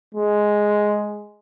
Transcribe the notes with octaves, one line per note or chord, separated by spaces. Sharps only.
G#3